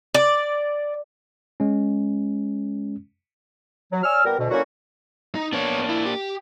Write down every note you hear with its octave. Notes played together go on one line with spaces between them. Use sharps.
D5
G#3 C#4
F#3
C#5 D5 G#5 E6 F6
A#2 G3 B3 G4 A#4
D2 B2
D3 F#3 A#3 C#4 E4 F#4
D#4
A#3 B3 D4 C#5
E4
G4